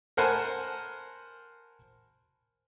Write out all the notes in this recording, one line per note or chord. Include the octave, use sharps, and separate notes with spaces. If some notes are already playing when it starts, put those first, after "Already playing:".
A#4 C5 F#5 G#5 A5 B5